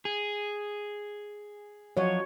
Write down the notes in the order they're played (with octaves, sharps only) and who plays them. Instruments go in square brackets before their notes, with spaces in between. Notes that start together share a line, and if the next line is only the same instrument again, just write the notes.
[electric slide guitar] G#4
[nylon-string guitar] F3 F#3 D#5 [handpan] C#5